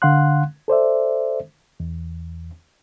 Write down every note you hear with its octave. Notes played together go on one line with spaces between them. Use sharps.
D3 F5 F#5 C6 F#6
A4 C5 D5 E5
E2